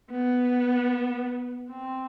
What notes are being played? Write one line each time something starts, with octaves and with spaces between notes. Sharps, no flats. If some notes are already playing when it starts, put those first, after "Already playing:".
B3
C4